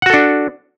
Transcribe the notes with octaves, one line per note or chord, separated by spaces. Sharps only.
D4 F#4 A4 F#5